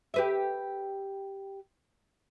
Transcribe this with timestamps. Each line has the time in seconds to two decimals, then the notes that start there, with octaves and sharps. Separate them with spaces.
0.14 G4 B4 E5